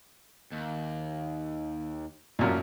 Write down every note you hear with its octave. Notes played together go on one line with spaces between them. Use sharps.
D#2
A1 F#2 A#2